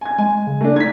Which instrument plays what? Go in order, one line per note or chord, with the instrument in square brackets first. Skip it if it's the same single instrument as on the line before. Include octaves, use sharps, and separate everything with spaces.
[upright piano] G#5 G#6
[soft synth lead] G#3 [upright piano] G#5
[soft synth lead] C#3
[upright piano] A3 D4
[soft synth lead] D#4 [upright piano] G#6 B6